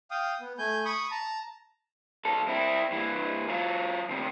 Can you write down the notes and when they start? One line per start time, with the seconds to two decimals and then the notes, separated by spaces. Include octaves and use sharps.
0.11 F5 G5 D#6
0.40 B3
0.59 A3 G#5 G6
0.85 B5 C#6 D#6
1.11 A5 A#5
2.25 B1 A4
2.48 C4 E4
2.91 C2 E3
3.48 F#3 F4
4.09 D2 C3